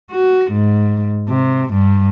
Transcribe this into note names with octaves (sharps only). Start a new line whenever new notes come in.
F#4
G#2
C3
G2